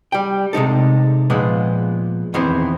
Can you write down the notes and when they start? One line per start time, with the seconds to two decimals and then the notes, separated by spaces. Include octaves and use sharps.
0.12 G3 G5
0.53 C3 G#3 D#4 A4
1.30 A#2 F3 G#3 B3
2.34 E2 D#3 B3 C4 E4 C5